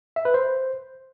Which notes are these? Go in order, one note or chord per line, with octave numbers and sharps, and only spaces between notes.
E5
B4
C5